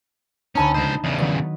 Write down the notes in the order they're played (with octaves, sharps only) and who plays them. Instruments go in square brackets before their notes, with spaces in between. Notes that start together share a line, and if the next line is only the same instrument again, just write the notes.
[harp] D2 D#7 [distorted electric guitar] C#4 [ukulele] D#4 A5 B5
[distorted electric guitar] C#2 C5 [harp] D#5
[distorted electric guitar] E2 C#3 [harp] D#5
[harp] D#3 F#3 B4 [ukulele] D5